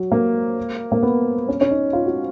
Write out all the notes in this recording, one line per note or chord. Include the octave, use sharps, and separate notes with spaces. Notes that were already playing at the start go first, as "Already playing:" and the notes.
Already playing: F#3
A#3
A#3
B3
C#4
C#4
D#4
F4
F#4